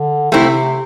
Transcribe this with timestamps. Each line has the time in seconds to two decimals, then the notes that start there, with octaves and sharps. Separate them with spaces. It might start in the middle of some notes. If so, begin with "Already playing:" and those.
Already playing: D3
0.32 C3 A3 C4 E4